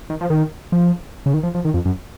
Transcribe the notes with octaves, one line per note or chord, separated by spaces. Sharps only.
D#3
F3
D#3
F3
C#3
D#3
F3
F3
D#3
F2
F#2